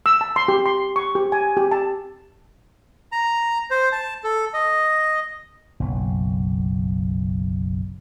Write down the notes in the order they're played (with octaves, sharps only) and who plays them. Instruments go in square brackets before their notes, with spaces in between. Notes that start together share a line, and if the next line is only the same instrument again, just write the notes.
[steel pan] E6
A5
C6
G4
C6
C#6
G4
G#5
G4
A5
[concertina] A#5
C5
A5
A4
D#5
[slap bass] F#1 B1